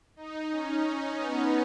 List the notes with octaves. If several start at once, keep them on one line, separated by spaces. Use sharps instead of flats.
D#4
C#4
C#4
B3